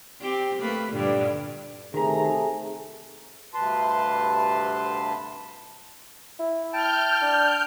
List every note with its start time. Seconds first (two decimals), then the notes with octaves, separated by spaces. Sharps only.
0.21 C4 G4
0.59 A3 A#3 B4
0.92 G2 A#2 D3
1.94 C3 D#3 A3 G#4 A#5
3.54 D2 G2 C3 B4 A5 C6
6.40 E4
6.73 G5 A5 F6 G6
7.22 D4